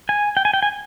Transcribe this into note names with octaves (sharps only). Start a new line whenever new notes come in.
G#5
G5
G#5
G5
G#5